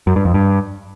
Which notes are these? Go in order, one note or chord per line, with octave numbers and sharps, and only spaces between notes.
F#2
G2
F2
G2